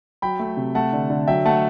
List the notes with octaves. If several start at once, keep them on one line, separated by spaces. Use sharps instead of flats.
F#3 G5 B5
A3
C3
A3 F#5 A5
D3
D3
F#3 E5 G5
A3 F#5 A5